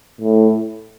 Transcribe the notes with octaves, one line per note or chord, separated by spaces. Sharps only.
A2